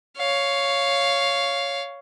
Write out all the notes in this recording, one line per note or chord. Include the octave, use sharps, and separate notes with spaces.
C#5 F5